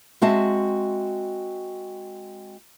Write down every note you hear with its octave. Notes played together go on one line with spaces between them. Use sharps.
G#3 C4 F#4 E5 A5